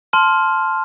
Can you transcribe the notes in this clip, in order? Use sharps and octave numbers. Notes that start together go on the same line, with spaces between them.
A5 C6 F6